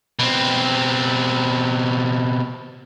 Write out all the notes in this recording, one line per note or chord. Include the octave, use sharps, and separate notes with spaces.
B2 C4